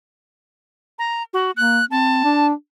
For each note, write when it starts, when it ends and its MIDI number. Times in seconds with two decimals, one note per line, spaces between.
0.99 1.23 82
1.33 1.51 66
1.57 1.81 58
1.57 1.85 90
1.91 2.24 60
1.91 2.47 81
2.24 2.53 62